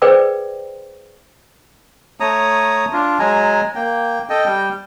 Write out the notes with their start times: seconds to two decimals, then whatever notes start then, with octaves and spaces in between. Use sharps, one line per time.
0.02 G#4 B4 C5 D5 G5 E6
2.20 A3 C#5 A#5 D#6
2.93 D4 F4
3.19 F#3 G#3 G#5 A#5
3.75 A#3 G5
4.30 A4 D#5 G5
4.46 G3 G5